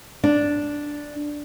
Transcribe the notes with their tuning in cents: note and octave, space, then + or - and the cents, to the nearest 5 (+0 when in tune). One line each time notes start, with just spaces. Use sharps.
D4 +0